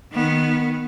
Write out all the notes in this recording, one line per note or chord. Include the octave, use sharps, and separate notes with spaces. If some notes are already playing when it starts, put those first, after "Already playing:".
D#3 B3